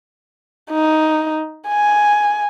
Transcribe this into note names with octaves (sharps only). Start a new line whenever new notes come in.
D#4
G#5